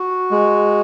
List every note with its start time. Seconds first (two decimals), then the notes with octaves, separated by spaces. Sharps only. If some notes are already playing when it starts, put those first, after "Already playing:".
Already playing: F#4
0.31 G#3